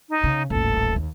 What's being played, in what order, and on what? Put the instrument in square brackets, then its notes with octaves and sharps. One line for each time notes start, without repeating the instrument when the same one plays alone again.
[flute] D#4
[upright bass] C#3
[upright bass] D#1 A1 [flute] A4
[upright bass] D#2